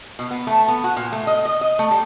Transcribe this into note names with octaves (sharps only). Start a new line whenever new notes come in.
B2
B3
A3
B3
F#4
A#2
A3
D#5
D#5
D#5
A3
G3